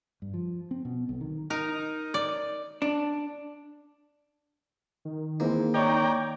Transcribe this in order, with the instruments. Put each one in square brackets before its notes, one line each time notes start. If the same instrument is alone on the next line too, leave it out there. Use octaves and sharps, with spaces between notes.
[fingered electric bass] G2
F3
C4
B2
B1
D#3
[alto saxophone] D#4 [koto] A#4
[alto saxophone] D#4
[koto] D5
[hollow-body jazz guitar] D4
[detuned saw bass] D#3
[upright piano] E3 G#3 C4 [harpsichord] A#3
[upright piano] D#4 C#5 [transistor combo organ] D5 G5 A#5